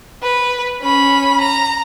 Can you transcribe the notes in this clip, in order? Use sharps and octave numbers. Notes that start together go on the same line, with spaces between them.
B4
C#4 B5
A#5